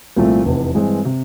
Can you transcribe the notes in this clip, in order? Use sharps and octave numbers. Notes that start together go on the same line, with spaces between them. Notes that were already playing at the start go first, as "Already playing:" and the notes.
C2 A#2 F3 A3 C4
F1 E2 C3
G2 E3 G#3 C4
C3